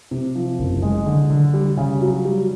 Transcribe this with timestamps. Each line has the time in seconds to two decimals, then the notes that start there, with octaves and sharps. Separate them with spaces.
0.11 C3
0.35 F3
0.58 F#1
0.82 G#3
1.06 D3
1.30 D3
1.54 G3
1.77 C#3
2.01 F#3
2.25 G3